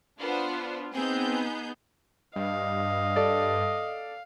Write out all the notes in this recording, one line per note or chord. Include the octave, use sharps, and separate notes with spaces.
B3 D4 F4 C5
B3 C4 D#4 G#4 G6
G2 D#5 F5
A4 D5